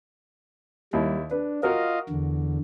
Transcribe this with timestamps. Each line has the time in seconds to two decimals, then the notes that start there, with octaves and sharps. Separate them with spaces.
0.93 D#2 G3 E4
1.31 D4 B4
1.63 F4 F#4 A#4 D#5 F5
2.09 E2 D3